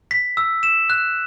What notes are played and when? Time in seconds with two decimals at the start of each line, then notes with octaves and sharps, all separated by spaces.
0.11 B6
0.37 E6
0.63 E7
0.90 F#6